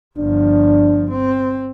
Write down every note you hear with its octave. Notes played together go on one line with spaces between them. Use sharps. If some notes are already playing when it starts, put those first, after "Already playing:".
G1 F3 D4
C4